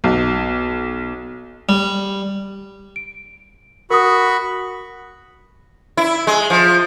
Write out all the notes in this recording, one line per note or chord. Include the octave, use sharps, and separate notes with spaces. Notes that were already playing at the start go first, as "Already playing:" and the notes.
B1
G3
D7
F#4 A#4 B5 C#6 D#6
E4
G#3
F3